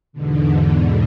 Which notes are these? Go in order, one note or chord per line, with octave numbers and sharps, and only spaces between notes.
E2 G#2 B2 D3